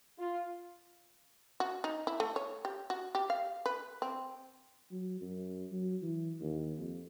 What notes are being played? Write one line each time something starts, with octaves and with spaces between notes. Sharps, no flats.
F4
F#4
D#4
E4
A3
C#5
G4
F#4
G4
F5
B4
C4
F#3
F#2
F#3
E3
D#2
F2